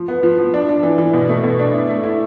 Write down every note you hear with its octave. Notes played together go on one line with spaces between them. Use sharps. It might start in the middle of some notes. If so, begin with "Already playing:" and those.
Already playing: F3
B3
F3
F3
D4
D4
E3
E3
B2
A3
B2
D4
E4
A3
E4